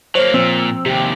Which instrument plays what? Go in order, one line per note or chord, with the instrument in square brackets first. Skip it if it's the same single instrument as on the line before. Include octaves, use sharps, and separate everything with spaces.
[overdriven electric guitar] F#3 A#3 [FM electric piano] C5 C#5
[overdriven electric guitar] A#2 [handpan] F3 [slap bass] C4 [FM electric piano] E6
[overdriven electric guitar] D#2 C3 [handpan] G4